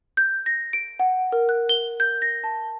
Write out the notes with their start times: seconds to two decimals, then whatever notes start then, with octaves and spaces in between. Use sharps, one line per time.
0.17 G6
0.46 A#6
0.73 D7
0.99 F#5
1.32 A#4
1.49 F#6
1.69 G7
2.00 G6
2.22 A#6
2.44 A5